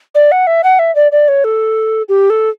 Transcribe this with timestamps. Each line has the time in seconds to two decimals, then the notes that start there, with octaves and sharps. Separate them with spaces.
0.15 D5
0.32 F#5
0.47 E5
0.64 F#5
0.79 E5
0.95 D5
1.12 D5
1.28 C#5
1.44 A4
2.09 G4
2.30 A4